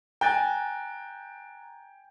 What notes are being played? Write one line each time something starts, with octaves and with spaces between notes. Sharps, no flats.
G5 G#5 A#5 F#6 A6